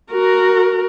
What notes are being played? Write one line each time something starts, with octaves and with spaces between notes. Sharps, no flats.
F#4 A#4